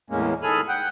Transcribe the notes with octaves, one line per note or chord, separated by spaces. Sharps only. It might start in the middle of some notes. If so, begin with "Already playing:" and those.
E2 A2 G#3 A#3 C#4
D#3 G#4 A4 G#5 B5 F6
F#5 G5 F#6